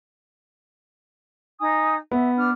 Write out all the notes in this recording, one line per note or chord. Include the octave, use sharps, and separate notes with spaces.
D#4 G#5 D#6
B3 E5
D4 F6